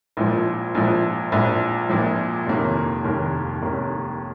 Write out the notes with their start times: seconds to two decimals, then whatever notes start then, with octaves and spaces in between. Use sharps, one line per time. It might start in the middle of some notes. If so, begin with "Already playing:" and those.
0.17 A#1 A#2 F3
0.75 A#1 A#2 F3
1.32 A#1 A#2 F3
1.89 A#1 A#2 F3
2.47 F1 D#2 D#3 A#3 C#4
3.04 F1 D#2 D#3 A#3 C#4
3.62 F1 D#2 D#3 A#3 C#4